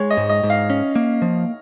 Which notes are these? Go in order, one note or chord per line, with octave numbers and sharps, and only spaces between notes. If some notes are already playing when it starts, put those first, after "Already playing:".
Already playing: G#3 C#5
D#5
G#2
D#5
G#2
F5
C#4
A#3
F3